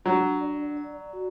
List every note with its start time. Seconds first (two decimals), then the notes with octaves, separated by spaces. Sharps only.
0.05 F#3 D4
0.41 D5
0.77 D5
1.13 F#4